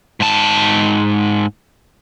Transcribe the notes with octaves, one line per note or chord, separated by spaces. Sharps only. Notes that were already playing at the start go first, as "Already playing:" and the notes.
G#2 A5